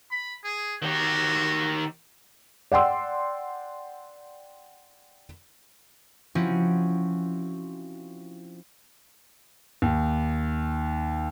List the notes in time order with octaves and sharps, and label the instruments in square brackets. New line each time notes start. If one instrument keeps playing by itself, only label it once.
[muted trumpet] B5
G#4
[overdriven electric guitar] D#3 G4 [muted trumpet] F#4
[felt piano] D5 F#5 G5 C6 E6
[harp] F3 C4 C#4 E4 F#4
[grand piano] D#2